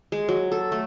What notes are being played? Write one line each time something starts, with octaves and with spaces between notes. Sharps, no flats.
G#3
F#3
A4
A3